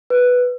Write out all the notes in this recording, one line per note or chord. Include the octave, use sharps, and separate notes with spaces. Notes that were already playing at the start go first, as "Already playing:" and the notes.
B4